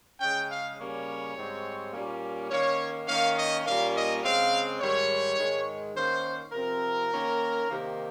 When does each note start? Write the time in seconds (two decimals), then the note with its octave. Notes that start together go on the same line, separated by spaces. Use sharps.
0.20 C#3 G#3 C#4 G5
0.50 F5
0.78 C#3 G3 A#3 C#4 C#5
1.36 G#2 G3 C4
1.93 A#2 G3 A#3 C#4
2.50 D#3 A#3 C#4 C#5
3.08 D#3 A#3 C#4 F5
3.37 D#5
3.65 A#2 G3 A#3 C#4 F5
3.94 D#5
4.22 C#3 G#3 C4 F5
4.80 G#2 D#3 G3 C#5
5.38 G#2 D#3 G#3
5.95 D#3 A#3 C#4 C5
6.52 C3 F3 C4 A#4
7.10 D#3 A#3 C#4
7.67 C3 D#3 A#3